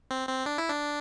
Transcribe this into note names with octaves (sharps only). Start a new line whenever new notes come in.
C4
C4
D4
E4
D4